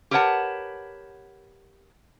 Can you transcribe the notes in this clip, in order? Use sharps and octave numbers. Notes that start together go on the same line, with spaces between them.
G4 A#4 B4 C#5 F#5 A5